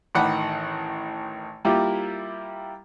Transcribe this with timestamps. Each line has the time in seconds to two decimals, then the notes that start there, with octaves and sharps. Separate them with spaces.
0.15 A1 D#3 F#5 B5 D6
1.65 G3 A#3 E4 F4 G4